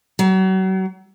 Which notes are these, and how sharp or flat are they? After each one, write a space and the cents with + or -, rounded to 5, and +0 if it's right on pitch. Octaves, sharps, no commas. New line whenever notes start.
F#3 +35